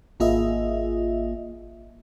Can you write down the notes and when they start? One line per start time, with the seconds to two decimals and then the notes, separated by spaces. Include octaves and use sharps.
0.20 G#1 A#3 F4 G#4 D#5 E5